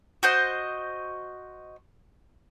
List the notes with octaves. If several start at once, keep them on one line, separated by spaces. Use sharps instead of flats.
F#4 C5 D#5